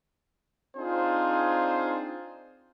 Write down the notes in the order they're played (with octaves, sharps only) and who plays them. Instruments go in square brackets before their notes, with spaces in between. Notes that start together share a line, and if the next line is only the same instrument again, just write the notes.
[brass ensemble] C4 D4 D#4 F4 G#4 C5